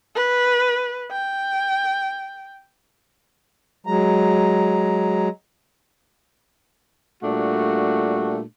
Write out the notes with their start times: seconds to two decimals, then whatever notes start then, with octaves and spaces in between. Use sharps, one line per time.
0.16 B4
1.12 G5
3.86 F#3 G#3 A#5
7.24 A#2 G3 A3 D4 F#4